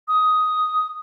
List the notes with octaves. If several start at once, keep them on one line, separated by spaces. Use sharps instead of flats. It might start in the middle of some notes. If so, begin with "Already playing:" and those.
D#6